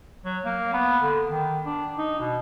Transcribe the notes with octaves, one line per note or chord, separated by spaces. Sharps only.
F#3
A#3
B3
D3
D#3
D4
D#4
B2